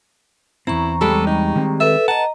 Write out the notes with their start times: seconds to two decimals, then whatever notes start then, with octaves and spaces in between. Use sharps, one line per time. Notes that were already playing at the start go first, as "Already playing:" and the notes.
0.67 E2 G#2 C4 E4 A#5 C#6
1.01 G3 G#3 A4
1.27 D#4
1.56 D#3 C4
1.80 A4 B4 E5
2.08 B4 D#5 F#5 A5 A#5